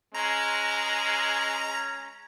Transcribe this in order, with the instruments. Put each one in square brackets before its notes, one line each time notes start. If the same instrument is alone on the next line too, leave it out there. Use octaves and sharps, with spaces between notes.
[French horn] G#3 [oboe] C#4 [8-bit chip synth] A#5